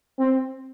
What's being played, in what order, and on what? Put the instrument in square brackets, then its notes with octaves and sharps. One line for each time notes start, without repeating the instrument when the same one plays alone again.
[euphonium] C4